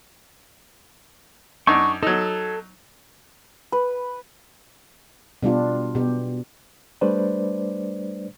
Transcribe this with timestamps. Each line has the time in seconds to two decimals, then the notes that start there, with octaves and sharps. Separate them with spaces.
1.67 F#2 D4 D#4 C#6
2.03 F#3 D#4 A4
3.72 B4
5.43 B2 G3 D4 F4
5.95 B2 G4
7.01 G3 A3 D4 B4 C5 D5